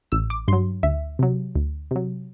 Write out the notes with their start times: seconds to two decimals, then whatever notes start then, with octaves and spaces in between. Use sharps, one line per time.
0.12 A1 E6
0.30 D6
0.48 G2 C6
0.52 F#3
0.83 D2 E5
1.19 C3 F#3
1.55 D2
1.91 C3 F#3